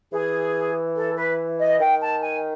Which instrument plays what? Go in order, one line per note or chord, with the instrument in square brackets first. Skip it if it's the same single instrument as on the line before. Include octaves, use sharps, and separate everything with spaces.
[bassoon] E3 [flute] G#4
[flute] A4
B4
D#5
[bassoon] D#3 [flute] G5
[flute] A5
G#5